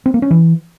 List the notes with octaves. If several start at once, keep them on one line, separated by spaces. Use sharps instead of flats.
C4
A#3
C#4
E3